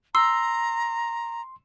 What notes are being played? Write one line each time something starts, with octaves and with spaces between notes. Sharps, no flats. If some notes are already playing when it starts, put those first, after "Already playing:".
A#5 C6 E6